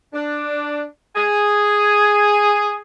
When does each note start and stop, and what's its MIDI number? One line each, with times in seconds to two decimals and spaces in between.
0.14 0.83 62
1.15 2.77 68